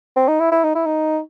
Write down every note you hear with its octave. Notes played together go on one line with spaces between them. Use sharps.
C4
D#4
E4
E4
D#4
E4
D#4